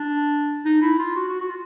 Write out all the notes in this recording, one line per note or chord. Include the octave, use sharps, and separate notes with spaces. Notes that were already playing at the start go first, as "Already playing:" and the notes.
Already playing: D4
D#4
E4
F4
F#4
F#4
F#4
F4